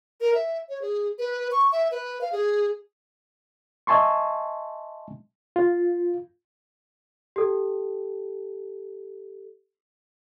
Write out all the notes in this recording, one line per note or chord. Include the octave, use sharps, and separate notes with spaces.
A#4
E5
C#5
G#4
B4
C#6
E5
B4
F5
G#4
D#5 E5 G#5 A5 C6 C#6
F4
G4 A4